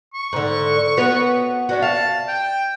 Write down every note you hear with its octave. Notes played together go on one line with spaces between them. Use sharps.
C#6
G#2 D3
B3 F#4 C#5
C#4 D4 F#4
F5 A5
G5